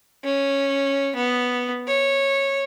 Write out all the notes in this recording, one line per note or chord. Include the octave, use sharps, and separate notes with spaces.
C#4
B3
C#5